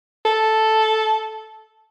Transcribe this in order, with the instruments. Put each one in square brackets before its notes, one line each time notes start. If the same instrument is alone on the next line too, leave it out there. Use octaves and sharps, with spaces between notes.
[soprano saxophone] A4